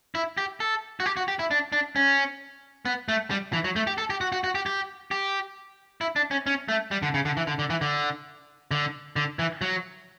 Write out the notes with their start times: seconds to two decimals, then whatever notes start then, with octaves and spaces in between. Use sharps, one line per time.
0.15 E4
0.38 G4
0.60 A4
1.00 F#4
1.06 G4
1.17 F#4
1.28 G4
1.39 E4
1.51 D4
1.72 D4
1.96 C#4
2.85 B3
3.08 A3
3.31 G3
3.53 E3
3.64 F#3
3.76 A3
3.87 G4
3.98 A4
4.10 G4
4.21 F#4
4.32 F#4
4.44 F#4
4.55 G4
4.66 G4
5.11 G4
6.01 E4
6.16 D4
6.31 C#4
6.46 C#4
6.68 A3
6.91 G3
7.02 D3
7.14 C#3
7.25 D3
7.37 E3
7.47 D3
7.59 D3
7.70 E3
7.81 D3
8.71 D3
9.16 D3
9.39 E3
9.61 F#3